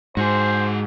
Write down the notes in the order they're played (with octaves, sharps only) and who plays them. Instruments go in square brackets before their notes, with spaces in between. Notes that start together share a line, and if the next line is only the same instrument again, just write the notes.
[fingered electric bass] G#2 [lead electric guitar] F#4 G#4 [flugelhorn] C5